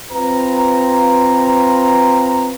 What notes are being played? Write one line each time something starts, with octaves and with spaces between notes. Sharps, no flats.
C4 F4 B4 A#5